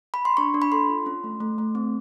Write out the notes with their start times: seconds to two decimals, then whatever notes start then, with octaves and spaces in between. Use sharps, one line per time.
0.14 B5
0.25 C6
0.37 D4 C#6
0.54 D4
0.62 B5
0.72 A4 C6
0.90 F4
1.06 C#4
1.24 A3
1.40 A3
1.58 A3
1.75 C4